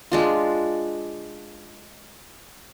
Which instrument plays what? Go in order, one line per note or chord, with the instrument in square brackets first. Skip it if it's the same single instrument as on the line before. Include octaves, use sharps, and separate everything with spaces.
[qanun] G#3 D4 F4